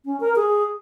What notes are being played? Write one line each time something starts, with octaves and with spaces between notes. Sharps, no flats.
C#4
A#4
G#4